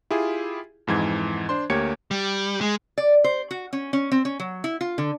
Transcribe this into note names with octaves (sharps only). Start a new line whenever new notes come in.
E4 F4 G4 G#4
F2 G#2 E3 G#6
D4 C5 C6
D2 A#3 G4 C#5 G#6 C#7
G3
G#3
D5
C5
F#4
C#4
C#4
C4
C#4
F#3
E4
F4
D3